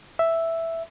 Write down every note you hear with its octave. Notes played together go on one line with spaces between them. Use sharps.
E5